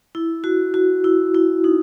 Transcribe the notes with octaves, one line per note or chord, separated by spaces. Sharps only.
E4
F#4
F#4
E4
E4
D#4